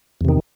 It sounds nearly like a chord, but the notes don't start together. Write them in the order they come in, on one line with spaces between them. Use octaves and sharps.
E2 C3 D#3